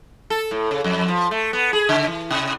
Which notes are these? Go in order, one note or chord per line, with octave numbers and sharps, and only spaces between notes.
A4
A2
C#3
F2
F3
A3
B3
G#4
C#3
E3
C3